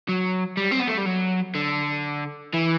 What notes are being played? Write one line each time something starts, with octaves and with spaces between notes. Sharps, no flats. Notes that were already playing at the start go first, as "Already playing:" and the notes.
F#3
G3
C4
B3
A3
G3
F#3
D3
E3